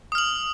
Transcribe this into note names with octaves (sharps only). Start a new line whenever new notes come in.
D#6 F6 F#7